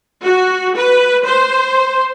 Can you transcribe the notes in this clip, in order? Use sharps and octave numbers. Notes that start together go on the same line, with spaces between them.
F#4
B4
C5